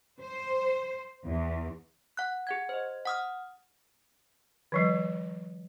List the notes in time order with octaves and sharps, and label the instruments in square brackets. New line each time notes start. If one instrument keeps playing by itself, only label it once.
[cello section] C5
E2
[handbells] F#5 F#6
G#4 F#5 G#6
C5 D#5
F#5 D#6 F6
[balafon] D#3 F3 G3